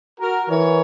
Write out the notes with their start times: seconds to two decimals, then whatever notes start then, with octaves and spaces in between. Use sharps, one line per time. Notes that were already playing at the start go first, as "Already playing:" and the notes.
0.20 F#4 A#4
0.49 E3 A#4 C#5